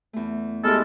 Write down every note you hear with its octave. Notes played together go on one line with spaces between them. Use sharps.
E2 A3
G#3 B3 E4 F#4 G4 A4 D5 F6